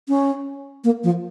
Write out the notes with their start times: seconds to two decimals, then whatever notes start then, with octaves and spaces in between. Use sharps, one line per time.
0.08 C#4
0.84 A#3
1.04 F3